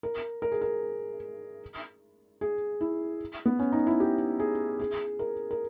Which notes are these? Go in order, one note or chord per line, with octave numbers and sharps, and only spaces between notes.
A#4
A#4
G#4
A#4
G#4
E4
B3
C#4
D#4
E4
G4
G#4
G#4
A#4
A#4